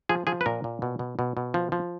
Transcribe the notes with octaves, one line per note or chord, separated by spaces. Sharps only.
F3 G#4
F3 G#4
B4
A#2 A#4
A#2
B2
B2
B2
B2
F3
F3